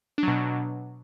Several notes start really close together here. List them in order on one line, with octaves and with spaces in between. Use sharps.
D4 F#3 B2